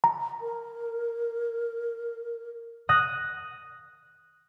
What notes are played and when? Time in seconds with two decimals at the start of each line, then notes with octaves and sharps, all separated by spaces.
0.04 A#5
0.41 A#4
2.89 D#6 F#6 A#6